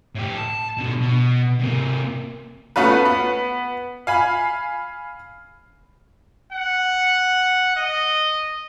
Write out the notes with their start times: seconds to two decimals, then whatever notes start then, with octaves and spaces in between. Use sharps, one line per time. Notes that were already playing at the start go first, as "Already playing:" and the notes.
0.15 A2 G4
0.38 A5
0.78 B2 D3
1.01 B2
1.60 C3 A#3
2.76 A3 B3 C#4 F4 B4
3.05 B3
4.07 F5 G#5 B5
6.53 F#5
7.76 D#5